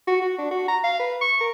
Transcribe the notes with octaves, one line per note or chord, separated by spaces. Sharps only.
F#4
F#4
D4
F#4
A#5
F5
B4
C#6
A#4